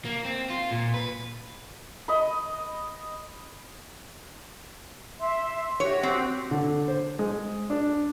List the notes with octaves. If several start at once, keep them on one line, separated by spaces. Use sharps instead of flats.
A#3
C4
F4
A#2
B4
D#5 B5
E5 C6
F#4 G4 C#5
C4
D3
C5
G#3
D4